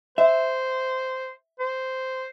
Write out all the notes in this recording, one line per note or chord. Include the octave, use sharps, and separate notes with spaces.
C5 E5
C5